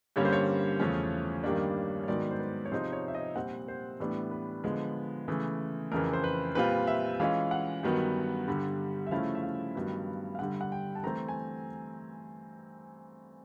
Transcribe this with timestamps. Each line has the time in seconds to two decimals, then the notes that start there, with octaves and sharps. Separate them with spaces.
0.16 G2 D3 G3 A#3 C#4 C#5
0.25 C5
0.33 C#5
0.80 E2 C#3 F3 A3 C#4
1.44 G2 D#3 G3 A#3 D4
2.03 C#5
2.08 G#2 D#3 F#3 B3 D5
2.31 C5
2.40 B4
2.65 C#5
2.72 C3 F3 G#3 C4 D#4 C5
2.93 C#5
3.08 E5
3.14 D#5
3.35 A#2 G3 C4 F#5
3.68 C5
4.00 A2 E3 G3 B3 D4
4.31 B4
4.64 D3 F3 G#3 B3
5.28 C#3 E3 A3
5.92 F2 C#3 E3 A#4
6.13 C5
6.24 B4
6.55 A#2 G3 C4 F4 B4
6.87 E5
7.20 E3 G#3 C#4 F4 F5
7.51 F#5
7.83 G2 D#3 F#3 B3
8.48 G2 D3 G3
9.07 E5
9.11 C#3 F3 A3 C#4 E4 F5
9.35 E5
9.43 F5
9.75 G2 D#3 F#3 B3
10.35 F5
10.39 G2 D3 G3 F#5
10.61 F#5
10.72 G5
10.95 A5
11.03 E3 A3 C4 A#5
11.28 G#5